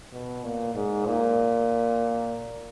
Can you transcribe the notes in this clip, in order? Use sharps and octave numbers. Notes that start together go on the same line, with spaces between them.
B2
A#2
G#2
A#2